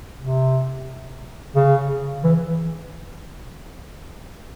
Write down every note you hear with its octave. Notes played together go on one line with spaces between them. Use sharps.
C3
C#3
E3